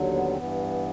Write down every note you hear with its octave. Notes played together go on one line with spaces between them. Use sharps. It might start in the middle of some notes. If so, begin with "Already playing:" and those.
Already playing: D#2 D3 F#3
B3
C4
G2 E3 B3